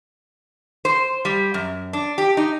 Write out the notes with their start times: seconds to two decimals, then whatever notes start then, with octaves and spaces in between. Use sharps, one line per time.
0.85 C5
1.25 G3
1.54 F#2
1.93 D4
2.18 G4
2.37 D#4